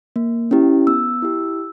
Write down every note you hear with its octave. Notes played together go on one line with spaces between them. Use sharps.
A#3
C#4 E4 G4
B3 E6
E4 G4